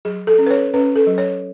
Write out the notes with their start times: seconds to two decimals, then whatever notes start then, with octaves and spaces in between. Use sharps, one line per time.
0.05 F#3 G#4
0.27 A4
0.38 C#4
0.46 B4
0.51 C#5
0.74 C#4 B4
0.96 A4
1.07 F#3
1.18 C#5